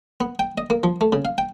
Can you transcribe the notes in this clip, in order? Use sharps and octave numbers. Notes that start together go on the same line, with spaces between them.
B3
G5
D#5
A#3
F3
A3
C#3
F5
G5